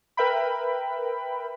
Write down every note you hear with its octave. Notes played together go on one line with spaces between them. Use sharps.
A#4 B4 E5 G5 B5